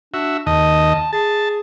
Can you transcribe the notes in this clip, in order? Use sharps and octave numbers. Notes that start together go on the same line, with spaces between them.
D4 F#4 E5
D#2 D#5 A5
G#4 A5